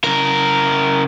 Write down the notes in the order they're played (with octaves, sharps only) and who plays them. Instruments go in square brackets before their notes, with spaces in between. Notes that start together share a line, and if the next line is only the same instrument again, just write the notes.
[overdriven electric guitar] C#3 A#4